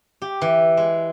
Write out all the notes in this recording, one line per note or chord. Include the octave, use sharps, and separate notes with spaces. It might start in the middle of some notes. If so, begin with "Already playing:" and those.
G4
E3
G#3